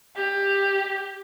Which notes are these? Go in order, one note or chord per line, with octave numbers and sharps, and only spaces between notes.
G4